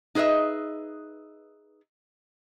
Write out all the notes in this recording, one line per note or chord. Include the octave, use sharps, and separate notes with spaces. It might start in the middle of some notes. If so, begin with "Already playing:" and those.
D#4 G#4 B4 D#5 E5